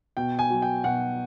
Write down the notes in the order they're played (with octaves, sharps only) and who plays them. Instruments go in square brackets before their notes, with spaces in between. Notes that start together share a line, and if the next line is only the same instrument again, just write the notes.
[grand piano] B2 G5
G#5
F#3
G5
B2 F#5